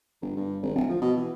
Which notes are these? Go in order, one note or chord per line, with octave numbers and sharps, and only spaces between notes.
G1
G2
G#1
D1
F3
B2
E3